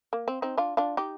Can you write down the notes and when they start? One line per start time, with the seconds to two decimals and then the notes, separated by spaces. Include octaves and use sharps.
0.13 A#3
0.28 C4
0.42 C4 D#4
0.57 D4 F4
0.77 D4 F4
0.97 D#4 G4